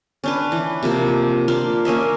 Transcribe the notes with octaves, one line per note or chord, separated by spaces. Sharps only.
C#4 D4 B4
E3
C3 F3 A#3
A#3 D4 F4
A#3 C#4 D#5 E5